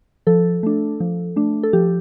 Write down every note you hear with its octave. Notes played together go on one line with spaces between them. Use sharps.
F3 A4
A3 D4
F3
A3 D4
A4
F3 G4